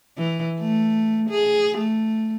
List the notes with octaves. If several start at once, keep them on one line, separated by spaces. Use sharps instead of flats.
E3
A3
G#4
A3